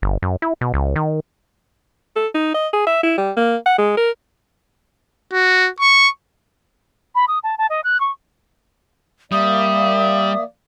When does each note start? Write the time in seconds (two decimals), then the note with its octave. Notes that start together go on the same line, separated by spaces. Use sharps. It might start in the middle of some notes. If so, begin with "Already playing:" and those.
0.02 G1
0.22 F#2
0.42 E4
0.61 B2
0.74 C#2
0.96 D#3
2.16 A4
2.34 D#4
2.54 D#5
2.73 G#4
2.87 E5
3.03 E4
3.17 G3
3.37 A#3
3.66 F#5
3.78 G#3
3.97 A#4
5.32 F#4
5.80 C#6
7.15 B5
7.28 D#6
7.44 A5
7.58 A5
7.70 D#5
7.84 F#6
8.00 C#6
9.32 G3 A#3 D5 E5 D#6